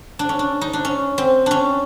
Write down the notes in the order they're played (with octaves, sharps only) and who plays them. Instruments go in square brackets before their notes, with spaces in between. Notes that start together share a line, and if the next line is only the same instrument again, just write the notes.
[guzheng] D4
C#4
D4
D#4
D4
C#4
C4
C#4 D4